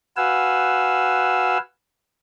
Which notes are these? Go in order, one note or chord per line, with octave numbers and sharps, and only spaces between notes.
F#4 B4 F5 F#5 G#5 E6